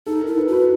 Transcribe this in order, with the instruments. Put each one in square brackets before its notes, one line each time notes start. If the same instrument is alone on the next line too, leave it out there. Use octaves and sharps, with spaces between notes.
[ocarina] D#4 [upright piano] A4
[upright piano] A#4
[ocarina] E4
[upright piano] B4
[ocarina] F#4 [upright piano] B4